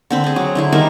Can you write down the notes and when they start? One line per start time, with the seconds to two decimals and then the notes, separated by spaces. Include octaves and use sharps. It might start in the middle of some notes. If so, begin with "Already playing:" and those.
0.10 D3 C4 B5
0.24 C4 G#4
0.36 F#3
0.55 D3 E4 G#4
0.72 D#3 G3 A#4 E5